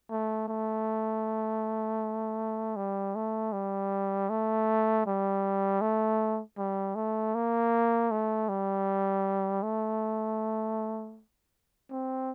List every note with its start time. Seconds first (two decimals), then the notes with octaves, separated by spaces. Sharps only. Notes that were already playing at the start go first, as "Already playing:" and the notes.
0.11 A3
0.48 A3
2.76 G3
3.15 A3
3.53 G3
4.29 A3
5.06 G3
5.81 A3
6.58 G3
6.95 A3
7.35 A#3
8.11 A3
8.49 G3
9.62 A3
11.91 C4